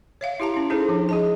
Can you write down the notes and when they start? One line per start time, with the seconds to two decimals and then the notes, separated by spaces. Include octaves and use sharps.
0.21 C#5 E5 F5
0.40 E4 G4 A5 A#5
0.54 C#4 E4
0.70 C#4 D#4 E4 G#4 A4 C5
0.89 F3 D4
1.09 G#4 D#5 A5